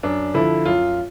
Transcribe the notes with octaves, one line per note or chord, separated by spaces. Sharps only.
F#2 D4
D3 F3 E4
F#2 F4